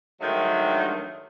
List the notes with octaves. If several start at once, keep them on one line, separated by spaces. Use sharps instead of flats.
G2 D3 D#3 F#3 G#3 A3